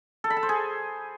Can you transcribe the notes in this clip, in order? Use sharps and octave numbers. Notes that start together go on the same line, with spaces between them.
A4
B5
A5
C5
G#4